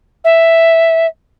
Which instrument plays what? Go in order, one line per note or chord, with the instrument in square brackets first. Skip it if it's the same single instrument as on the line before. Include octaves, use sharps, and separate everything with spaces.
[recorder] E5